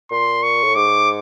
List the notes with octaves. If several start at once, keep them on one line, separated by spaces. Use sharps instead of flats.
A#2 C6
C#6
A2
G#2 D6